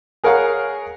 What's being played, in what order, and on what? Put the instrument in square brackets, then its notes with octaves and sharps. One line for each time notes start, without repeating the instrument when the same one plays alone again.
[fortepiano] G#4 A#4 C#5 F5 F#5 A#5